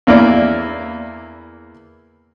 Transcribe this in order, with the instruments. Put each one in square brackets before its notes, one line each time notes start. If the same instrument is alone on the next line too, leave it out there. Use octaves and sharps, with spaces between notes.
[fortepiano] E2 A#3 E4 D5